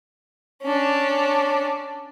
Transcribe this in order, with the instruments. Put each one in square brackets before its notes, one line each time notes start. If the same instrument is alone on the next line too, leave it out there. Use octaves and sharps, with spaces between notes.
[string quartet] C#4 D4